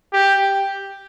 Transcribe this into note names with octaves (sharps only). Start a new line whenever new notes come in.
G4